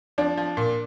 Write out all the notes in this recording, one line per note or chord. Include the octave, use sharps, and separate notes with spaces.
F3 D4
F3
A#2